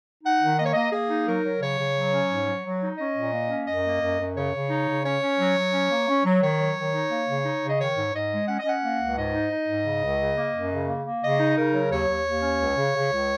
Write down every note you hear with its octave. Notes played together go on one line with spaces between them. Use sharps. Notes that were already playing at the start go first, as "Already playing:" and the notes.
D#4 F#5
D#3
A#3 D#5
C#5
A#3 D#5
A#3 G#4
D#4
F#3 A#4
F#3
C#3 C#5
C#3
F#3
C#4
G#2
F#3
F#3
D#4
C#4 D#5
A#2
A#3
C#4
F#2 D#5
A#3
F#2
F#2
C#3 C#5
C#3
D#4
C#3
C#4 C#5
C#4
F#3
F#3
C#4
A#3
C#4
F#3
D#3 C#5
F#3
D#3
D#4
A#3
C#3
D#4
C#3
D#5
D#3 C#5
G#2
G#2 D#5
G#3
C#4 F#5
D#5
C#4 F#5
A#3
C#2
G#2 D#5
D#4
D#4
G#2
C#3
C#2
C#3
A#3
F#2
C#3
A#3
A#3
C#3 D#5
D#4
C#3 A#4
F#3
D#2 C#5
D#2
D#2
C#4
C#2
C#3
C#3
C#2